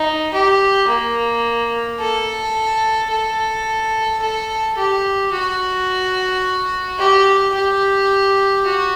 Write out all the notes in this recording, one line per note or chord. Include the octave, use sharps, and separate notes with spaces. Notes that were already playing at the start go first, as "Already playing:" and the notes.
Already playing: D#4
G4
A#3
A4
A4
A4
G4
F#4
G4
G4
F#4